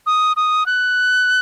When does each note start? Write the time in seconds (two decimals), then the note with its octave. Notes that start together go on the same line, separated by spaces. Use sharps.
0.06 D#6
0.37 D#6
0.66 F#6